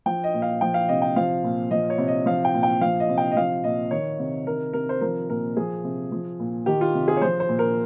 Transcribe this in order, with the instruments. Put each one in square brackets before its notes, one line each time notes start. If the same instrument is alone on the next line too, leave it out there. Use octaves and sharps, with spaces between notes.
[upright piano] F3 G5
D#5
A#2
F5
F3 G5
F5
C3 D#5
G5
F3 F5
A#2
F3 D#5
C#5
C3
D#5
F3 F5
G5
A#2
G5
F3 F5
D#5
C3
G5
D#5
F3 F5
A#2 D#5
D#3 C#5
C3
D#3 A#4
C3 A#4
C5
F3 A#4
A#2 A#4
F3 G#4
C3
F3
A#2
D#3 G4
F4
C3
G#4
C#5
F3 C5
C5
A#2
A#4